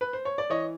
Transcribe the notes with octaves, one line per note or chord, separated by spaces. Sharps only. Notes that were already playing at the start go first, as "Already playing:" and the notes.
B4
C5
C#5
D5
E3 C#5 D#5